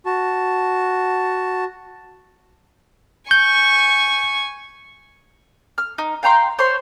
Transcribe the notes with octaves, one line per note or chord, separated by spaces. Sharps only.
F#4 A5
G#5 C#6 G6
F6
D#4
F5 G5 A#5 C6
C5 C#5 C6